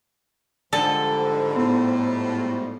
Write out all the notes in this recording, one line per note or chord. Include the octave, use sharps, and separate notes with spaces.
G#2 D3 F3 G3 A4 D5 F#5
A2 B3